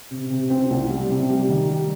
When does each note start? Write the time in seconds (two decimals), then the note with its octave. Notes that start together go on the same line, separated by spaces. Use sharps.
0.11 C3
0.30 C3
0.50 C4
0.70 C2
0.90 G3
1.10 C3
1.30 G3
1.49 D#3
1.69 G3